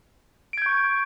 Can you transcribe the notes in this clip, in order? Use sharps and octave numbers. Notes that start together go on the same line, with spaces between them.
C#6 G6 G#6 D7